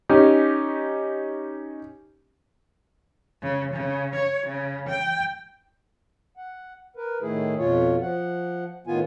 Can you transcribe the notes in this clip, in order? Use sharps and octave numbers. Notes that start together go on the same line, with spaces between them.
C#4 D#4 G4
C#3
C#3
C#5
C#3
G5
F#5
A#4 B4
A2 D#3 A3 E4 G#4
F2 B2 F4 C#5
F3 F#5
A2 D#3 B3 F4 G#5